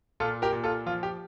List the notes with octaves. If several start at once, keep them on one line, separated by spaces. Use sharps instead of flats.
A#2 F4 A4
G4 A#4
A#2
F4 A4
F3 F4
G4